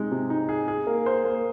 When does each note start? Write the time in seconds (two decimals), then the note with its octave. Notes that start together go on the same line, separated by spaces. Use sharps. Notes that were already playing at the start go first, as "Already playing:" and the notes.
Already playing: C3 G#3 D#4 G#4
0.12 C3
0.30 D#4
0.49 G#4
0.68 G#4
0.87 A#3
1.06 C5
1.24 A#3